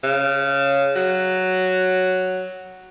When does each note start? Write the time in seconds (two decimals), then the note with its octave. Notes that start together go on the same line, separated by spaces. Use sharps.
0.04 C#3
0.96 F#3